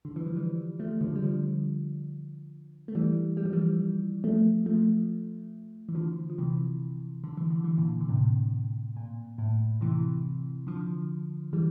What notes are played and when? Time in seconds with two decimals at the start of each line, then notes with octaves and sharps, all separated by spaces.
0.05 D3
0.16 E3
0.26 F3
0.36 E3 G3
0.79 F3 A3
1.01 D3 F3
1.16 G3
1.22 D3 F3
2.88 A3
2.95 E3 G3
3.37 G3
3.45 F3
3.53 E3 G3
4.24 F3 A3
4.66 F3 A3
5.89 E3
5.95 D3 F3
6.30 F3
6.38 C3 E3
7.24 D3
7.37 E3
7.50 D3
7.64 E3
7.78 A#2 D3
8.01 D3
8.09 A2 C3
8.96 A#2
9.38 A2
9.81 C3 E3
10.67 D3 F3
11.53 E3 G3